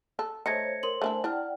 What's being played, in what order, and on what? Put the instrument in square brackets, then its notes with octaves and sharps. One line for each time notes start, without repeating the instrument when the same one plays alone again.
[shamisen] A4
[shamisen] A3 D#4 [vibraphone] C5 C#5 [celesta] G#6 A#6 C#7
[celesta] A#4 C6 F#7
[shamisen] A3 D4 E4 [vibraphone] C5 G#5
[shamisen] D4 [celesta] E4 F6 [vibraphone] D5 F#5 G5